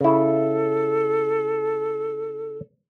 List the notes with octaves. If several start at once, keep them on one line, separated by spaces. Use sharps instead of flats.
C#3 E4 A4